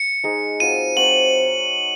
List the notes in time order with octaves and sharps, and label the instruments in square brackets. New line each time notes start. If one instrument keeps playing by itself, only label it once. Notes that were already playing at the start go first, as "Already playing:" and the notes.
Already playing: [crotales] C#7
[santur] G#3 D#4 G#4
[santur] F#3 C4 F4 [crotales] D#7
[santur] F#3 C4 F4 [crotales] F#7